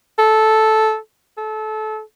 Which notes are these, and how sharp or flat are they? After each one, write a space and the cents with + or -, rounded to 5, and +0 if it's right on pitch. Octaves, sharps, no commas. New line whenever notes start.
A4 -10
A4 -25